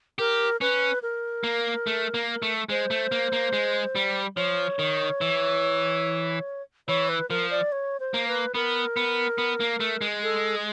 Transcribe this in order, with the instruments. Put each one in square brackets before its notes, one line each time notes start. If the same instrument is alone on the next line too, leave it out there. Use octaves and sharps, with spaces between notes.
[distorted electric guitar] G4 [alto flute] A#4
[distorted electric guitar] C#4 [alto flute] B4
[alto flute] A#4
[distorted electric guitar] A#3
A3
A#3
A3
[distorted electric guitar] G#3 [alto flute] C5
[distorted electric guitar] A3
A#3
A#3
G#3
G3
[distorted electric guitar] F3 [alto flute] C#5
[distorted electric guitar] D#3
E3
[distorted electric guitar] E3 [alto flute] C#5
[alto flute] B4
[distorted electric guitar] F3 [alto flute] A#4
[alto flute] D5
C#5
C5
[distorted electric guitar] A#3
[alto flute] B4
[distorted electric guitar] B3 [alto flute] A#4
[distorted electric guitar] B3
B3
A#3
A3
G#3
[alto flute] A4
G#4